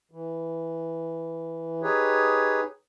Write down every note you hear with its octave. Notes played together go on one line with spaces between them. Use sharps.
E3
D#4 G4 G#4 B4 C#5